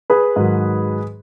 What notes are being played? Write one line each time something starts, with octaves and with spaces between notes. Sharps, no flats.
G#4 B4
G#2 D#3 F#3